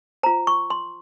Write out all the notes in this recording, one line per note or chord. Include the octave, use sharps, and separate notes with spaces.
F4 C5 A#5
C#6
C6